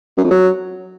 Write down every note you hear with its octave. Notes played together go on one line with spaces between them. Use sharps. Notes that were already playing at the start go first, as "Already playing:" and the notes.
F#2
F2
F#3